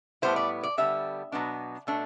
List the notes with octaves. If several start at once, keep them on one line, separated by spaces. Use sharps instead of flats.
A2 G3 B3 E4 C5
D5
D5
D3 G3 B3 E5
B2 F#3 B3 D4
B2 A3 D4